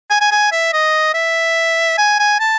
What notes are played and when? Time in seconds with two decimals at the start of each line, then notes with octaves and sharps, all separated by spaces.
0.10 G#5
0.21 G#5
0.31 G#5
0.52 E5
0.73 D#5
1.14 E5
1.98 G#5
2.19 G#5
2.40 A5